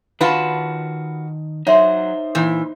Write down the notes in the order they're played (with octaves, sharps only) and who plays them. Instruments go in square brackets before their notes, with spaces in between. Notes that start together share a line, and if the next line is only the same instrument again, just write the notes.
[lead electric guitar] D#3 A5 [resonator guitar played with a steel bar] F4 F#4 B4
[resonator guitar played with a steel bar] F#3 [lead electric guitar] D#4 C5 [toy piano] C#5 E5 C6
[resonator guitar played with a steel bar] A#2 E3